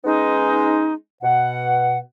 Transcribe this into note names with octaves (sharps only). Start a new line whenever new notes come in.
G#3 B3 C#4 D#4
B2 F#5